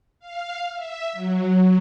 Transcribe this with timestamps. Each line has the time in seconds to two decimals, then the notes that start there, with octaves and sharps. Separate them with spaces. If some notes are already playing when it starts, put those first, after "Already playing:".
0.20 F5
0.74 E5
1.13 F#3